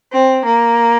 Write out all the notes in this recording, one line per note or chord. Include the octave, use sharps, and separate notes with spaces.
C4
A#3